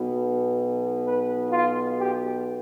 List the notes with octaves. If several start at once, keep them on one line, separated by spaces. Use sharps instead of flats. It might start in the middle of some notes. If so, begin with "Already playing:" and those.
Already playing: B1 B2 B3
B4
F4
G4